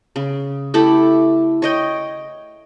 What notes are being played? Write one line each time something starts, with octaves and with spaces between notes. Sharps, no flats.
C#3
A3 E4 G4 A4
C#5 D#5 G5